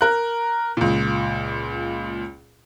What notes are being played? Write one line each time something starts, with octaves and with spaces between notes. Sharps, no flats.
A#4 F#6
C#2 A#2